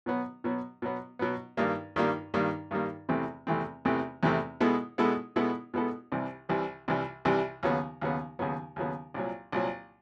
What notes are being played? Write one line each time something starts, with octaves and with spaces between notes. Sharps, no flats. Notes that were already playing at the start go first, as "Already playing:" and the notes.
B2 F#3 B3
B2 F#3 B3
B2 F#3 B3
B2 F#3 B3
G2 D#3 G3 A#3
G2 D#3 G3 A#3
G2 D#3 G3 A#3
G2 D#3 G3 A#3
E2 C3 E3 A3 C4
E2 C3 E3 A3 C4
E2 C3 E3 A3 C4
E2 C3 E3 A3 C4
B2 G#3 B3 E4 A4
B2 G#3 B3 E4 A4
B2 G#3 B3 E4 A4
B2 G#3 B3 E4 A4
C2 C3 E3 G3
C2 C3 E3 G3
C2 C3 E3 G3
C2 C3 E3 G3
D#2 C#3 F#3 B3
D#2 C#3 F#3 B3
D#2 C#3 F#3 B3
D#2 C#3 F#3 B3
C2 A#2 F#3
C2 A#2 F#3